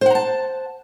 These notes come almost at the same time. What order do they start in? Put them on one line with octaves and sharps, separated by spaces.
C5 F#5 A#5 A5